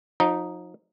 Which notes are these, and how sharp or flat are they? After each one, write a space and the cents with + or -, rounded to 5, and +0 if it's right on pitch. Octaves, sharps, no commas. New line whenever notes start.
F3 +40 D#4 +0